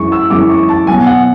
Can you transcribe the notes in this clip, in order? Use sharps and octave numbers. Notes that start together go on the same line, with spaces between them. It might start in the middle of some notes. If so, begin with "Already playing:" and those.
Already playing: F#2 E3 G#3 C#6
E6
F#2 E3 G#3 D6
C#6
A5
B2 F#3 G#5
F#5